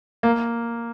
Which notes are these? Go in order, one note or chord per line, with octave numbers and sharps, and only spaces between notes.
A#3